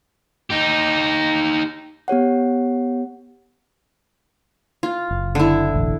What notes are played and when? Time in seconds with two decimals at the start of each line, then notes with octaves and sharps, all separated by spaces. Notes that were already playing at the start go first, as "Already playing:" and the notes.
0.50 D#4 G4
2.08 B3 G4 C#5 F#5
4.83 F4
5.11 F#1
5.35 D3 E4
5.74 E1 A1